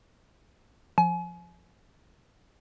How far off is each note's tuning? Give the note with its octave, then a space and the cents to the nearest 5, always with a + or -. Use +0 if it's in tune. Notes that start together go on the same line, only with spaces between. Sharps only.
F3 +0 G#5 +35